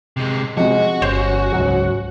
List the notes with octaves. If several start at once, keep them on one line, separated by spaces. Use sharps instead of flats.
C3 G#3
C3 F3 G#3 F#4
G1 C#4 C5
C#2 G#2 F#3